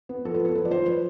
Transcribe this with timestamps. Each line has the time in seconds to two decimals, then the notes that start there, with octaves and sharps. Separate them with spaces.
0.09 B3
0.25 F3 A4
0.34 B4
0.40 B3 A4
0.55 F3 B4
0.65 D5
0.71 F3 C5
0.86 F3 B4